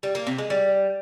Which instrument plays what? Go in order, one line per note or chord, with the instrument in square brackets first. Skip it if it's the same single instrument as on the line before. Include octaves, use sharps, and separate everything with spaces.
[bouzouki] G3
A#3
C3
G#3
G3